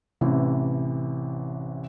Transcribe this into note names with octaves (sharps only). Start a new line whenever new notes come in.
A1 C3 E3